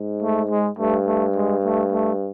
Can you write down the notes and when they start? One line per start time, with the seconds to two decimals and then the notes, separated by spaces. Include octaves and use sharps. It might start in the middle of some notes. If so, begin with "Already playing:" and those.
Already playing: G#2
0.22 A3
0.50 G#3
0.79 G2 A3
1.07 A3
1.36 G#3
1.64 A3
1.92 A3